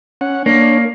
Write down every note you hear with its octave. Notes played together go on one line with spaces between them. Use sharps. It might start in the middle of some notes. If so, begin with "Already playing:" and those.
C#4 F#5
A#3 D4 C#5